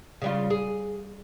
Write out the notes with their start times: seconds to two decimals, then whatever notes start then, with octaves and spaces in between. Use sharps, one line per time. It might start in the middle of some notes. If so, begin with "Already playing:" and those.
0.22 C#3 G3 F4
0.50 G#4